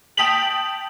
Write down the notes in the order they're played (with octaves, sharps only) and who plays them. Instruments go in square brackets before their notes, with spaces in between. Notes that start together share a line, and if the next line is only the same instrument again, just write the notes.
[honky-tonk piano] G5 A5 D#6 B6 F7 F#7